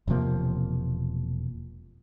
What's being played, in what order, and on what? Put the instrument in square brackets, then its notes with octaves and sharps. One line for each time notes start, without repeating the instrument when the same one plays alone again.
[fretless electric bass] E1 C3 F3 A#3